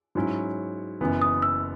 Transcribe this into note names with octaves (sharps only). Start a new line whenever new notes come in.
G#2 F#3 C#4 E4
F#1 F#2 E3 B3
D#6
E6